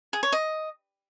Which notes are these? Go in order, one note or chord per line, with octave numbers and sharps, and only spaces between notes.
G#4
C#5
D#5